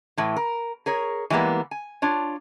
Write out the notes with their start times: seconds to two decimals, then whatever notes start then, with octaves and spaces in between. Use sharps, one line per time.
0.17 A2 E3
0.36 A#4
0.86 G#4 A#4 C#5
1.30 E3 G3 G#3 A#3 B3
1.71 G#5
2.02 D4 F4 C#5